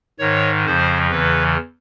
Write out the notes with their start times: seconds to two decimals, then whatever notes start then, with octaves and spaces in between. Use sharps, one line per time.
0.19 G#2 D#3 C#5
0.66 F2 C#3 F3 C5
1.11 E2 C#3 E3 B4